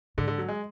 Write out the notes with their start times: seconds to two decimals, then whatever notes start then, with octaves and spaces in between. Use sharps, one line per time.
0.18 G#2 D3
0.28 D3
0.38 F#3
0.49 G#3